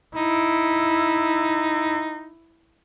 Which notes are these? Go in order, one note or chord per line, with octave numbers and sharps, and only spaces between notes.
D#4 E4